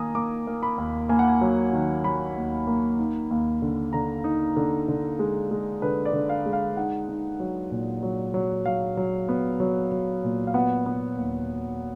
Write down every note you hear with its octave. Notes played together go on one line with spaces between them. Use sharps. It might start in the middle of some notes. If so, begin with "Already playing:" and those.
Already playing: D#3 A#3 G#5 A#5 D#6
A#3 D6
A#3
B5
D#2
A#3 G#5
F#5
G#5
F#3
D#3
F#3 B5
D#2
A#3
D#4
D#2
D3
D3 A#5
D#4
D3
D3
G#3
G#3
D3 B4
D5
D3
F5
G#3
F5
D#4 F#5
D#4
F#3
A#2
F#3
F#3
F#3 F5
F#3
B3
F#3
F#3
A#2
F5
B3 F#5
B3
D#2